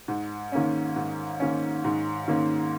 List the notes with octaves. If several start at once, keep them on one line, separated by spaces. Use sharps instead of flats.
G#2
D#3 A#3 C#4
G#2
D#3 A#3 C#4
G#2
D#3 A#3 C#4